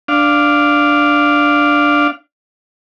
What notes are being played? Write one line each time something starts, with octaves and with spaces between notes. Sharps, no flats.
D4 F5